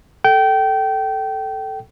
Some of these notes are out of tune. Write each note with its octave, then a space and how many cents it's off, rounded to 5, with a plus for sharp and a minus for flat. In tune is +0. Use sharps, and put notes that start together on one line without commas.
A4 +0 G5 -25